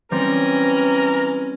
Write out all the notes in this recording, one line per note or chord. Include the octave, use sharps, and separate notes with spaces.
E3 G3 C4 C#4 A#4